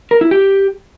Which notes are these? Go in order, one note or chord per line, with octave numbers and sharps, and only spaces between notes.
A#4
E4
G4